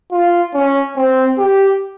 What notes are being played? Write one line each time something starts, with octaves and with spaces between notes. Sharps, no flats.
F4
C#4
C4
G4